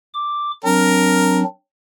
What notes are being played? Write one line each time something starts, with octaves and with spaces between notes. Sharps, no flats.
D6
F#3 C4 D4 A#4